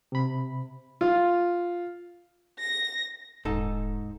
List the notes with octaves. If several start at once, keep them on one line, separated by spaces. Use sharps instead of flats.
C3 B5
F4
A#6
D#1 G#2 D#4 A4